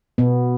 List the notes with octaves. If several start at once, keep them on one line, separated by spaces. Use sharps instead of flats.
B2 B3